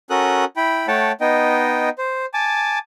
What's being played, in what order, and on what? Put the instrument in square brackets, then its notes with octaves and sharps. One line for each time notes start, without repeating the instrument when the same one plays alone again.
[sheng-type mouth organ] C#4 F#4 A4 A#4 D#6 F#6
E4 G5 B5
A3 C#5 F#5 G5 A5
B3 D#4 D#5 G5
C5
G#5 A5 D6